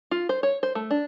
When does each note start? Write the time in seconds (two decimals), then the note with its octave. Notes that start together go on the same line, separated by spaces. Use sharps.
0.11 F4
0.29 C5
0.43 C#5
0.63 C5
0.75 A3
0.91 D4